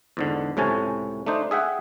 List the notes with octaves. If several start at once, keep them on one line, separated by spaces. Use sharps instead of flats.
E2 G#2 D3
C#2 A2 C3 C#4 G#5 A5
A3 D4 D#4 C5
G#4 E5 F#5 G5